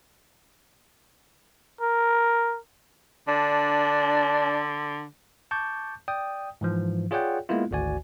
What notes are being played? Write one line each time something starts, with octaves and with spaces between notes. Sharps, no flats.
A#4
D3 D4
A5 C#6 D6 G6
D5 G5 D#6
G#2 E3 F3
F4 G#4 C#5 D5 F#5 G5
G#3 A#3 B3 E4 F4
G#1 D2 F#4 D5 G#5